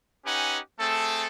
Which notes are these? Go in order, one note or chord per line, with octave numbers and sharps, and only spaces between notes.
C#4 D#4 G4 B4 F#5 G#5
A3 C4 G#4 A4